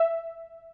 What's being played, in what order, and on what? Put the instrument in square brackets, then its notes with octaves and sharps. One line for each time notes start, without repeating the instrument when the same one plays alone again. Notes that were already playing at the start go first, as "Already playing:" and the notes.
Already playing: [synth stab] E5